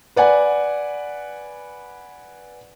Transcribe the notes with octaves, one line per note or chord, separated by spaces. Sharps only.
B4 D5 F#5 G#5